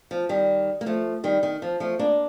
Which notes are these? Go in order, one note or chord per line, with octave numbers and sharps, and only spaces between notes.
F3
D#3 G3
A#3
F3 A3
D#3 G3
D#3
F3
F3 A3
A#3 D4